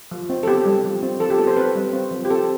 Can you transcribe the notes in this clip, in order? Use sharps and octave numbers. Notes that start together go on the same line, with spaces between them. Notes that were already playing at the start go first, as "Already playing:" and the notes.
F3
C4
A4
B3 G4
G3
F3
C4
F3 A4
G4
B3 A4
C5
C4 B4
G3
C4
F3
G4
C4 A4